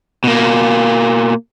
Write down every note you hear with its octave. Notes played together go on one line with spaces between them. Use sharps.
B2 A#3